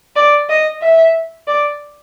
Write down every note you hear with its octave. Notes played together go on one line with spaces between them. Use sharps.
D5
D#5
E5
D5